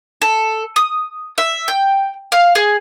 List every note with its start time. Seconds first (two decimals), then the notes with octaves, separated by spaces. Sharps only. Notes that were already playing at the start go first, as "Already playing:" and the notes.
0.22 A4
0.76 D#6
1.38 E5
1.68 G5
2.32 F5
2.55 G#4